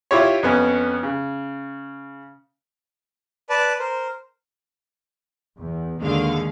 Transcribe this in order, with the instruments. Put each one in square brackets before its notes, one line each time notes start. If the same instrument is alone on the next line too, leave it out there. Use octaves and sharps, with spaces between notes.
[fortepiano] E4 F4 G4 C#5
F2 B3 C#4
C#3
[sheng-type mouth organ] B4 D5 A5
A#4 C5
[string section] E2
D#2 D3 G#3 F5